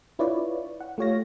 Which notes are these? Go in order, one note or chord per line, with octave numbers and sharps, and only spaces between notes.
D4 E4 F4 B4 C#5 D5
F#5
A3 F4 G4 C#5 F5 A#6